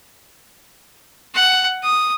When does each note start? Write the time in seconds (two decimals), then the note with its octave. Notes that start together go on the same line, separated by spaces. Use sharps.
1.35 F#5
1.84 D#6